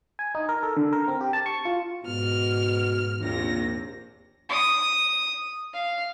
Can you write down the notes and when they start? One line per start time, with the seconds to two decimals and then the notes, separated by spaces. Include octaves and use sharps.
0.19 G#5
0.35 D#4
0.49 A#4
0.63 A4
0.77 D3
0.93 A#4
1.08 C4
1.21 G4
1.33 A5
1.46 C#6
1.65 F4
2.05 G#2 B2 F6
3.20 A#1 D#2 C3 A#6
4.49 D#6
5.74 F5